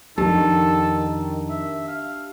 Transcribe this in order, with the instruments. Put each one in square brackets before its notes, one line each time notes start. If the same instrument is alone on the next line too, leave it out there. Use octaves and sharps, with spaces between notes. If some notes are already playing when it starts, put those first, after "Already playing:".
[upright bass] F2 [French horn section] D#3 [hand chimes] D4 G4 A5 [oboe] A4
[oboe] E5
F5